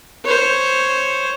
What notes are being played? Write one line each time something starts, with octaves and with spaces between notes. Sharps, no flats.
C5 C#5